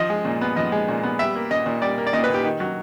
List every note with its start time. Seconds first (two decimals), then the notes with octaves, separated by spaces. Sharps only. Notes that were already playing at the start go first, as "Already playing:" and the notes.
Already playing: F3 D#5
0.10 G#3
0.25 A#2
0.41 B3
0.56 F3 D#5
0.72 G#3
0.88 A#2
1.03 B3
1.19 G3 E5
1.35 A#3
1.50 A#2 D#5
1.66 A#2
1.82 G3 D5
1.98 A#3
2.07 D5
2.13 A#2 D#5
2.24 B4
2.30 A#2 G4
2.44 D#3
2.60 F#3